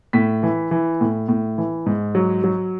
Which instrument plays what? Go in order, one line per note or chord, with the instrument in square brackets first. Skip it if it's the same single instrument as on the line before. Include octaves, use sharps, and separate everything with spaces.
[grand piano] A2 B6
E3
E3
A2
A2
E3
G#2
F#3
F#3